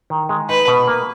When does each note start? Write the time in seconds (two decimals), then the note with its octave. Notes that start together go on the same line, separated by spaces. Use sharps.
0.10 D#3
0.29 G#3
0.49 D#4 B4
0.68 B2
0.87 A#3